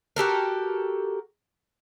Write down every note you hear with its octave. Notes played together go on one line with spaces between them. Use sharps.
F#4 G4 A4 A#4